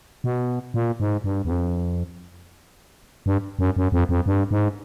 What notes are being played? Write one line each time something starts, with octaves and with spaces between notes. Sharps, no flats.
B2
A#2
G#2
G2
E2
F2
G2
F#2
F#2
F2
F2
G2
G#2